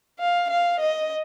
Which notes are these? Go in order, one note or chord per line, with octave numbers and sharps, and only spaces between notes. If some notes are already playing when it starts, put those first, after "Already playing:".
F5
F5
D#5